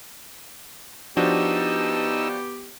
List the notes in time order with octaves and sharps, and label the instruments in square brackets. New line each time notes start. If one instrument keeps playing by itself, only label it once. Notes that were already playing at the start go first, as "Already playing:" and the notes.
[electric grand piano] F3 D4 F#4 [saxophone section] B3 G4 [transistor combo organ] D#4 E6